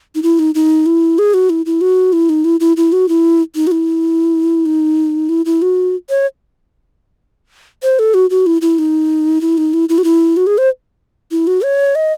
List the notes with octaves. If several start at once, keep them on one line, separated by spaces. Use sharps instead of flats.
D#4
E4
D#4
D#4
E4
G#4
F#4
E4
E4
F#4
E4
D#4
E4
E4
E4
F#4
E4
D#4
F#4
E4
D#4
E4
E4
F#4
C#5
C5
A4
F#4
F#4
E4
E4
D#4
E4
D#4
E4
E4
F#4
E4
F#4
G#4
C5
E4
F#4
C#5
D#5